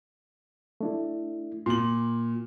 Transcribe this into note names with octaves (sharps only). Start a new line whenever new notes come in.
A3 D4 E4
A#2 C6 F#7